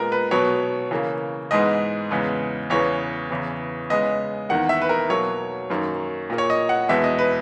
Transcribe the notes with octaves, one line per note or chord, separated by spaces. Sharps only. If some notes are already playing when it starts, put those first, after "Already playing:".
Already playing: A#2 G#3 B3 A#4
B4
B2 F#3 B3 C#5
C#3 E3 A#3
G#2 E3 G#3 B3 D#5
E2 C#3 G#3 B3
E2 C#3 E3 B3 C#5
E2 C#3 E3
C#3 G#3 B3 D#5
E2 D#3 A#3 F#5
E5
B4
A#4
B2 F#3 A#3 C#5
F#2 D#3 A#3
A#2 A#3
C#5
D#5
F#5
E2 B2 G#3 B3 E5
D#5
B4